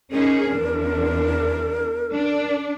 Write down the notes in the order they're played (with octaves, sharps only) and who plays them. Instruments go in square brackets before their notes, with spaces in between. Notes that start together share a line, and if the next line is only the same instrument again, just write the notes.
[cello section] C#4 D#4 G#4 [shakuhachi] A#4
[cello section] E2 D4
D4